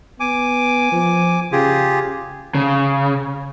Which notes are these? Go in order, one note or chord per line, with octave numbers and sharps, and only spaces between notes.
B3 G#5 D6
F3
C#3 F4 G4 G#4
C#3